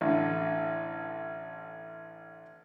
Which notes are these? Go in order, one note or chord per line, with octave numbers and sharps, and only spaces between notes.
A1 D3